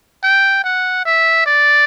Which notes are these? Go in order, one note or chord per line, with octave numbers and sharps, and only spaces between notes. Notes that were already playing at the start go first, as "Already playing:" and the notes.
G5
F#5
E5
D5